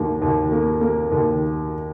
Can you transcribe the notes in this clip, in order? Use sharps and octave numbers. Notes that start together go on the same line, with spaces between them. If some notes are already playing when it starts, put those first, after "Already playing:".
Already playing: D#2 A#3
D#2
A#3
A#3
D#2